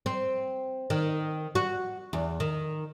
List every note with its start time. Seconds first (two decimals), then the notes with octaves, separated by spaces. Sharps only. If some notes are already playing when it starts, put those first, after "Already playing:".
0.06 C4
0.90 D#3
1.55 F#4
2.13 E2
2.40 D#3